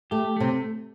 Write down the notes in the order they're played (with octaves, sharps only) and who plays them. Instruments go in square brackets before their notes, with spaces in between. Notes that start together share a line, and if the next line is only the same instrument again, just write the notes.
[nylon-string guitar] A3 [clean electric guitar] G4
[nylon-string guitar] C3 [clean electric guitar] A3